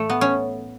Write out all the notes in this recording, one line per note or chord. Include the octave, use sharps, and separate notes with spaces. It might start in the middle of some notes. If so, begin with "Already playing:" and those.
Already playing: A2 E3 A3
B3
C#4